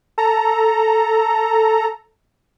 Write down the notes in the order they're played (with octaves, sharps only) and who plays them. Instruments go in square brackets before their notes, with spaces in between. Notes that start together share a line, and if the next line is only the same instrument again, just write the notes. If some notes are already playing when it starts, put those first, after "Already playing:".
[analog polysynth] A4 A#5